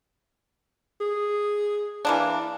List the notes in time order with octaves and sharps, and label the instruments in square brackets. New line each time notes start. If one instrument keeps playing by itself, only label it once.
[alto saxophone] G#4
[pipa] E3 A#3 D4